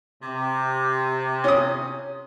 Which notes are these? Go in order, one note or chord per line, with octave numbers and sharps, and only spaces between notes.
C3
C#4 D#6